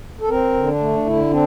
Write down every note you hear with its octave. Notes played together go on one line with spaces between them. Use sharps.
A4
C4 A#4
D3
D4
A3
D3 E4
C4 D4